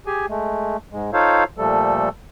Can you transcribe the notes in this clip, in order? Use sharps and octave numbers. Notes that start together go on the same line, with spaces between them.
G4 G#4 G#5
G#3 A3
G#2 G#3
D#4 F4 A4 C5 C#5 F5
A#2 F3 G3 A3 A4